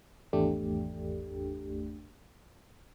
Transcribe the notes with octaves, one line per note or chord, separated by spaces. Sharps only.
G#1 E2 A3 D4 G4